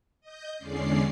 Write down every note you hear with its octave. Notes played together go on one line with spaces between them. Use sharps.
D#5 G6
E2 D3 G#3 C#4 D5 C7